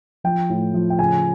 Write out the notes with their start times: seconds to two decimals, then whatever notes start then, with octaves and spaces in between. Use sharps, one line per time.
0.24 F3 G5
0.50 A2
0.74 F3
0.90 G5
0.99 C#3 G#5